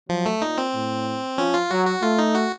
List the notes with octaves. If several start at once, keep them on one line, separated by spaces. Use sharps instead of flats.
F3 F#3
A3
A#2 D#4
C4
A2
F3 C#4
F4
F#3 F#4
F#4
A3 F4
D#4
F#4